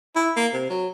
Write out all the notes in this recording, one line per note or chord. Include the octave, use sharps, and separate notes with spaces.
E4
A#3
C3
F#3